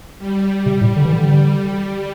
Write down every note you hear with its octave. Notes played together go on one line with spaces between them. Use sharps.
G3
C3
A2
D3
E3
D3